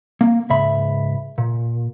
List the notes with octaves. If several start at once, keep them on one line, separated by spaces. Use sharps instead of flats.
A#3
C#2 G#2 E5 B5
A#2